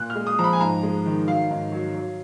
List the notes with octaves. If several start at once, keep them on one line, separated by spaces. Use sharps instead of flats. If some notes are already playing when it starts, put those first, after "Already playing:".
Already playing: A#2 F#6
F6
G#3
D#6
F3 A#5
B5
G#5
G#2 A#5
G#3
D#3
F#3 F5
G#2
F#3
F#3